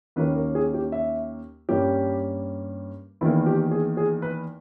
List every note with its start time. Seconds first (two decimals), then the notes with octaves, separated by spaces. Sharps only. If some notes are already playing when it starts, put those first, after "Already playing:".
0.16 D#2 D#3 A#3 C#4 B4
0.36 A#4
0.55 G#4
0.74 G4
0.92 E5
1.69 G2 G3 A#3 C#4 G4
3.21 E2 D#3 A#3 E4
3.46 G4
3.71 G#4
3.97 G#4
4.22 B4